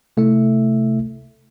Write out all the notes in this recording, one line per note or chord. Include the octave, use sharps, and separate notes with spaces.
C3 A3 E4 E5